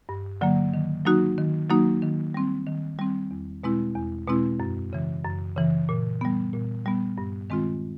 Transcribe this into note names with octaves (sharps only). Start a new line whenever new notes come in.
G2
D3 F#3 A#3
D#3
F#3 A#3 D#4 F#4
D#3
F#3 A#3 D#4 F#4
D#3
G3 C4
D#3
G3 C4
E2
B2 G#3 C4 E4
E2
B2 G#3 C4 E4
F#2
C#3 E3
F#2
C#3 E3
A#2
G3 B3
A#2
G3 B3
G2
D#3 G#3 C4 F4